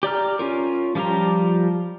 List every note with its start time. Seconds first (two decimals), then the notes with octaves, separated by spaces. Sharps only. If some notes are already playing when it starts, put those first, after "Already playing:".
0.03 G4 D5 A#5 F6
0.39 C#4 F4 A#4
0.95 F3 G3 F4 G4 A#5